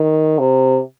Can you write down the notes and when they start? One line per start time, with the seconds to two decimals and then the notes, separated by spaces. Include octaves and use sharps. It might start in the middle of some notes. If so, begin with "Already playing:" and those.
Already playing: D#3
0.39 C3